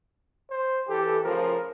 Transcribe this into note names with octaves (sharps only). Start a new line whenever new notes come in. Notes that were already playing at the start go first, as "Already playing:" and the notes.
C5
E3 G4 A4
A2 C#3 F3 A#4